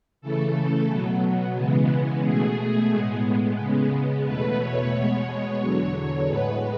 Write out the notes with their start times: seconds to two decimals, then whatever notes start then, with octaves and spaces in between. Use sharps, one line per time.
0.21 C#3 E3 A3 A4
0.55 A4
0.89 B2 F#3 B3
1.56 C#3 E3 G#3 B3
2.23 B2 A3 G#4
2.91 A2 G#3 B3
3.58 C#3 G#3 B3
4.25 E2 B2 A3 B4
4.59 C#5
4.92 B2 G#3 B3 C#5
5.61 E2 D3 F#3
6.27 A2 G#3 B3 B4